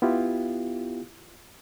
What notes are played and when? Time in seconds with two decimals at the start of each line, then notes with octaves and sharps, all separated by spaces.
0.02 B3 E4 F4 G4